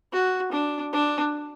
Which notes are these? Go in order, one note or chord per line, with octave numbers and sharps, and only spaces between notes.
F#4
D4
D4